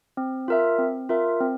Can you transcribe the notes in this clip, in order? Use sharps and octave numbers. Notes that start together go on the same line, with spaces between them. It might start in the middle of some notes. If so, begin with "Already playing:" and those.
C4
F4 A#4 E5
C4
F4 A#4 E5
C4